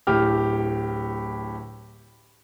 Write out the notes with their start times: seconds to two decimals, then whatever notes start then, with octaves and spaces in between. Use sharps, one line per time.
0.07 D1 A2 G4 F6